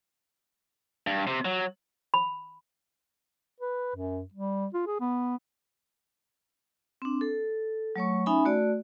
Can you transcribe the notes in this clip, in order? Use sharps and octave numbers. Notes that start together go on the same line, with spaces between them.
G2
C3
F#3
B5
B4
F#2
G3
F4
G#4
B3
C4 D4
A4
F#3 A3 C#5 C#6
C#4 D#4 E5 G#5 B5
A3 F#4 D5